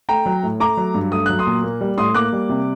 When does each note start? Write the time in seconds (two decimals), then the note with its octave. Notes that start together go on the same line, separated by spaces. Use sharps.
0.09 A3 G5 A#5
0.26 F#3
0.43 A2
0.60 A3 A#5 D6
0.77 F#3
0.94 G2
1.12 A3 D#6
1.26 F#3 F#6
1.39 C6 D#6
1.47 A#2
1.63 A#3
1.81 G3
1.98 A2 C6 D#6
2.14 A#3 D6 F#6
2.33 G3
2.49 C3